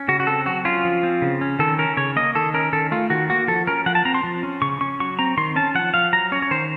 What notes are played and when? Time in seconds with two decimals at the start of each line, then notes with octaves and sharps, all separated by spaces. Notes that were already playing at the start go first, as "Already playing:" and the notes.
Already playing: C#4
0.08 C#3 F#4
0.20 F#4
0.27 C4 A4
0.46 F#3 F#4
0.65 C#4 F4
0.85 F3
1.03 C4
1.22 C#3
1.41 C#4
1.59 D#3 A4
1.78 C#4 A#4
1.97 C#3 C#5
2.16 A#3 D#5
2.35 D#3 A4
2.54 C#4 A#4
2.73 D#3 A4
2.92 A3 F4
3.10 D#3 F#4
3.29 A#3 F#4
3.48 F3 A4
3.67 C#4 A#4
3.86 F3 F#5
3.95 A5
4.05 C4 A#5
4.14 C6
4.24 F3
4.43 C#4
4.62 C#3 C#6
4.81 C#4 C#6
5.00 F#3 C#6
5.19 C4 A#5
5.37 D#3 C6
5.56 C#4 A5
5.75 F3 F#5
5.94 F3 F5
6.13 F#3 A#5
6.32 C#4 C#5
6.42 C#5
6.51 D#3 C5